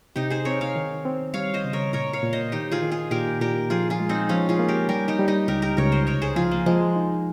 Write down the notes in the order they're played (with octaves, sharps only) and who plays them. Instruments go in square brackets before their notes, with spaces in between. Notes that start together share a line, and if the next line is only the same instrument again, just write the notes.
[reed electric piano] C3 [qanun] D#4 G4
[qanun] G#4 C5
[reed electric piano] C4 [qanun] A#4 C#5
[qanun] C#5 F5
[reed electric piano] D#3
C4
[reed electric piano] G3 [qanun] C#5 F5
[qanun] C5 D#5
[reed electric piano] C#3
[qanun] A#4 C#5
[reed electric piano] A#2 [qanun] A#4 C#5
[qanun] C#5 F5
[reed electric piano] A#2
[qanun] C5 D#5
[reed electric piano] D#3 [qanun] D#4 G4
[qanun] F4 G#4
[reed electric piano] D#3
[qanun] F4 G#4
[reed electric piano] A#2 [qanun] G4 A#4
[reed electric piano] A#2 [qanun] G4 A#4
[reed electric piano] F3 [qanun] F4 G#4
[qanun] F4 G#4
[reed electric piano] G#3
[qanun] C4 D#4
[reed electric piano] F3 [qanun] C#4 F4
[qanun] F4 G#4
[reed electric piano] A#3
[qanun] G4 A#4
[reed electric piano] G3 [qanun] G4 A#4
[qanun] D#4 G4
[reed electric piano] G3
[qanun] D#4 G4
[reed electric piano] C#2 [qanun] G4 A#4
[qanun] G4 A#4
[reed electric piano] C#2 [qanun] A#4 C#5
[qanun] C5 D#5
[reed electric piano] C2 [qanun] A#4 C#5
[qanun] G#4 C5
[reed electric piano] F3 [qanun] F4 G#4
[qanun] A#3
[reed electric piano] F3 [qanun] G#3
[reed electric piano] D#4